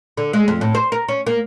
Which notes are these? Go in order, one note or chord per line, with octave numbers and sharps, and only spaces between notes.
D3
G#3
F2
A2
C5
A#4
C#4
A#3